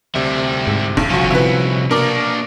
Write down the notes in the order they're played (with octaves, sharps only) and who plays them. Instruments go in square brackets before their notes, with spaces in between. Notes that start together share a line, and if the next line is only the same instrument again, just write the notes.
[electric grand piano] D2 C3 [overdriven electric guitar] G3 E4
[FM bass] G#2
[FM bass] F1 [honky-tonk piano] B1
[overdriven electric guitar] C2 C#4 [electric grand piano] F3 F#4
[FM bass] C3 [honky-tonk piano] E4 B4
[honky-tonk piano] B2 [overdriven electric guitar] A#3 D4 [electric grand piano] A#4 D6